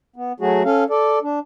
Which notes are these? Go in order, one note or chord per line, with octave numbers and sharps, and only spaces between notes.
B3
F#3 A3 F#4 G#4
C#4 A4 F5
A4 D5
D4